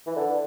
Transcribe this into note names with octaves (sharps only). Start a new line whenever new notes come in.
E3
D3